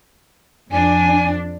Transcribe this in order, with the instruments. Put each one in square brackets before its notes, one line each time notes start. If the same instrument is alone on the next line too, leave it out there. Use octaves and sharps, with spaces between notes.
[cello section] F2 D4 [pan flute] G#5